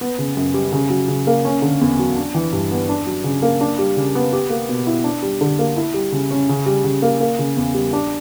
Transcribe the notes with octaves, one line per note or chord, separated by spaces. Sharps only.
B3
C#3
F#2
G3
C#3
F#3
C#3
A#3
C#4
D3
E2
F#3
D4
E3
G2
B3
D4
F#3
C#3
A#3
D4
G3
C#3
B3
G4
A#3
B2
E4
D4
G3
D3
A#3
E4
G3
C#3
C#4
C#3
G3
C#3
A#3
A#3
C#3
E2
G3
D4